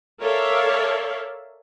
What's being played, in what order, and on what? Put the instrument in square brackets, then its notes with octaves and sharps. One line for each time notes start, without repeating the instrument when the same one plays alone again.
[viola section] A4 A#4 C#5 D5 E5 F5